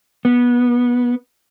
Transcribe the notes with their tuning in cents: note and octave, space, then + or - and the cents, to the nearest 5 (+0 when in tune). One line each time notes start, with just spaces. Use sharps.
B3 -20